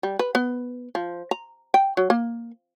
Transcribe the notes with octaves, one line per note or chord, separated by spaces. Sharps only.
G3
B4
B3
F3
A#5
G5
F#3
A#3